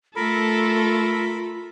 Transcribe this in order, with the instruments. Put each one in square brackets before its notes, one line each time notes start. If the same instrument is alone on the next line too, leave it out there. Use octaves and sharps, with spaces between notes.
[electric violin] A3 A4 [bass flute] F4 [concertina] A#4 [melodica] B5